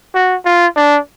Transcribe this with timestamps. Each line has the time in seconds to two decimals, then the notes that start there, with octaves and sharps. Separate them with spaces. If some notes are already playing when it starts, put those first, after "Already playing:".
0.14 F#4
0.45 F4
0.76 D4